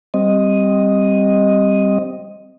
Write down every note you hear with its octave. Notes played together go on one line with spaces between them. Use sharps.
G3 C4 D#5